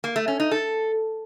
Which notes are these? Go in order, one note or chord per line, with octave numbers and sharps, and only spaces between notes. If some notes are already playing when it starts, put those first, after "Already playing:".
A#3
A3
C#4
D#4
A4